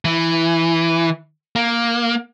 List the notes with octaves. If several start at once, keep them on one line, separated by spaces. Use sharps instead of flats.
E3
A#3